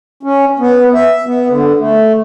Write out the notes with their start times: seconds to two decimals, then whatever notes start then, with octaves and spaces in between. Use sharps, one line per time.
0.23 C#4
0.59 B3
0.94 E5
1.26 B3
1.49 D3
1.79 A3